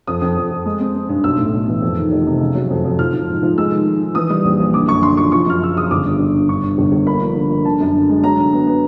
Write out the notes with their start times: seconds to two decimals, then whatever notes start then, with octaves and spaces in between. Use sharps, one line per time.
0.07 F2 D#6
0.22 F2
0.37 F2
0.51 F2
0.66 G#3
0.80 C4
0.95 C4
1.09 G2
1.24 B1 E6
1.39 A2
1.53 B1
1.68 E3
1.82 F2
1.97 D#3
2.11 F1
2.27 C3
2.41 C#3
2.55 F#3
2.70 F2
2.84 F2
2.99 F3 F6
3.14 F3
3.28 G#2
3.43 F3
3.58 G#3 E6
3.72 D#3
3.86 D#3
4.01 D#3
4.15 E3 D#6
4.30 G3
4.45 A#1
4.60 A#1
4.74 D3 D6
4.88 F#2 C#6
5.03 D3 C6
5.17 F3 C#6
5.32 F3 C#6
5.46 F#2 F6
5.61 C#3 E6
5.76 C#3 D#6
5.91 G1 D6
6.05 G2
6.20 G1
6.34 G2
6.49 G2 C#6
6.63 G2
6.78 G1
6.92 G1
7.07 A#3 B5
7.22 F3
7.36 D3
7.51 A#3
7.65 D3 A5
7.80 F#2
7.95 D3
8.09 G#3
8.24 F#3 A#5
8.39 D3
8.53 B3
8.67 B3